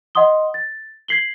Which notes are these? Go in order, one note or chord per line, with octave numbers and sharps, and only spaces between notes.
D#5 F#5 C6 D#6 G7
A6
G#6 B6 C7 F#7 G7